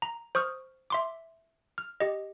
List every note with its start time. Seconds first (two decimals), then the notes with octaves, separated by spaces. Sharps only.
0.02 A#5
0.35 C5 C#6 D#6 F6
0.90 E5 C6 D6
1.78 F6
2.00 G4 D#5